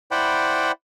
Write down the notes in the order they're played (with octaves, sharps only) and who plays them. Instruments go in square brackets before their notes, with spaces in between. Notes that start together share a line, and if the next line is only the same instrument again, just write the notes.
[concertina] E4 C5 D5 F#5 G5 B5